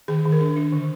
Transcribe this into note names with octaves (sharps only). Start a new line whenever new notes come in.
D#3 G#4
D#3
A#4
D4
D4
D3